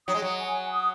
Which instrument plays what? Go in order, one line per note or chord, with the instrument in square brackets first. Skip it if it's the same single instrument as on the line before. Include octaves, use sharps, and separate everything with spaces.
[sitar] F#3 [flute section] D#6
[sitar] G#3
F#3
[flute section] G#5
D#6